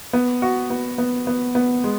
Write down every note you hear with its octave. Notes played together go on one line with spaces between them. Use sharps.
B3
F#4
B3
B3
B3
B3
G#3